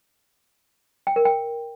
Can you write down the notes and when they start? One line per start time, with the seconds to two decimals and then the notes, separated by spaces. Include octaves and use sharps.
1.07 G5
1.16 A#4
1.25 G5